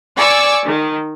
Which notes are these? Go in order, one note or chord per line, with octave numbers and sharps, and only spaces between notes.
D5 G#5 C#6 D6 E6
D#3